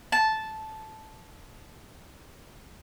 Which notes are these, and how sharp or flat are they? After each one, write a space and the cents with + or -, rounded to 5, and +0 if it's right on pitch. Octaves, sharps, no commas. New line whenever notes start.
A5 -10